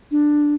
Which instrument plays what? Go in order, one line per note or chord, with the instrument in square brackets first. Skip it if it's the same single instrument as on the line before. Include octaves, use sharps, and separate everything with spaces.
[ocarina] D4